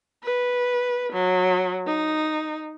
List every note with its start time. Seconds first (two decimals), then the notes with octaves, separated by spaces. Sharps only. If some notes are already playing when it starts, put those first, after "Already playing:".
0.25 B4
1.13 F#3
1.87 D#4